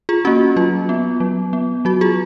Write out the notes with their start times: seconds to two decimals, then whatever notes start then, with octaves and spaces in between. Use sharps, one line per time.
0.09 F4 G#4
0.25 A#3 C#4 F#4
0.56 F#3 F4
0.89 B3
1.20 F#3
1.53 B3
1.85 F#3 F#4
2.01 F4 G#4